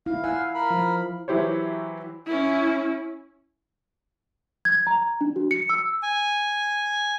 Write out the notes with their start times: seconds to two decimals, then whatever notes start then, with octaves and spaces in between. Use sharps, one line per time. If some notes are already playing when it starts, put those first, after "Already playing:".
0.06 E4 F5
0.24 F5 F#5 G#5 E6
0.55 A#4 B5
0.70 F3
1.28 E3 F#3 E4 G4 C5 C#5
2.26 C#4 E4
4.65 G#6
4.87 A#5
5.21 D4
5.36 F#4
5.51 C#7
5.70 E6
6.03 G#5